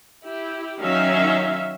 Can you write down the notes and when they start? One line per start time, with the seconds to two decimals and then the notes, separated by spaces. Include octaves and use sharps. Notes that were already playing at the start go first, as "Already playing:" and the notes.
0.23 E4 G4
0.79 D#3 F#3 C#4 D#4 E5 F5